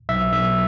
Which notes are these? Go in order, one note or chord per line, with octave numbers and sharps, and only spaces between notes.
B1 E5
B1 E5